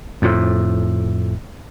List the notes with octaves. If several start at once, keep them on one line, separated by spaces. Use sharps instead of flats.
F2 A2